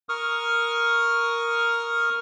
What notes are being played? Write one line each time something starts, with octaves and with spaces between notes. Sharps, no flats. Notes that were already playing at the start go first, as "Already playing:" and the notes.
A#4 C#6 D#6 F6